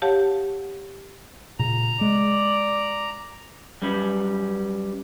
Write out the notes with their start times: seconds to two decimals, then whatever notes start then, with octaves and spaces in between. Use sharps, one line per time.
0.02 G4 C#5 F5 F#5 A5
1.59 A#2 C#3 A#5
2.01 G#3 D5
3.82 F#2 G3 C#4 B4